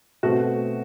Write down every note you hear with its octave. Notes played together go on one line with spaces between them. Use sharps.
B2 A3 C4 F#4